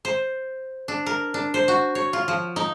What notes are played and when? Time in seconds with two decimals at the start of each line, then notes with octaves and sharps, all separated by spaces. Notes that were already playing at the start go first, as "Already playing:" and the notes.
0.05 C5
0.88 D4
1.06 A#4
1.34 D4
1.54 C5
1.68 F#4
1.95 C#5
2.13 F4
2.28 F3
2.56 D#4